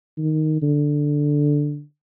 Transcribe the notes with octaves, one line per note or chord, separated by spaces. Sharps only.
D#3
D3